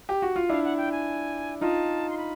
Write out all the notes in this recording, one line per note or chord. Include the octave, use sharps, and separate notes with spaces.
G4
F#4
F4
D4 E4 F5
F#5
G5
G#5
D#4 F4 A5
C6
B5